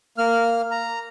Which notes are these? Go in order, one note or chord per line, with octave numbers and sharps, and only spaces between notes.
A#3 F6
A#5